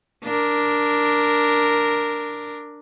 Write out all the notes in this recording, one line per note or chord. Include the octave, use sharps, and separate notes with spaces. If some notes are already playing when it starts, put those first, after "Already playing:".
D4 A#4